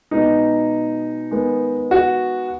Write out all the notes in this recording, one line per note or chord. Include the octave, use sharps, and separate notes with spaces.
B2 G#3 B3 D#4
D#3 G#3 B3
F#4